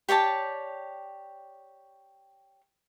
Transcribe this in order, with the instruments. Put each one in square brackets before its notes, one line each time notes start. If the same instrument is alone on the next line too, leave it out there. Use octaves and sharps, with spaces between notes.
[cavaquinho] G4 C#5 D5 A5